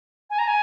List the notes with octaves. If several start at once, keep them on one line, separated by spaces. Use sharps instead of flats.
G#5
A#5
G#5